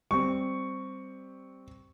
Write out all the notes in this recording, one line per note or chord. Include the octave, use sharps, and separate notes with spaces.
G3 C4 C#6